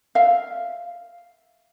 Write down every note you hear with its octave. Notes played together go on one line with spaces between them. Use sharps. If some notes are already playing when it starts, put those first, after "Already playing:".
E5 F5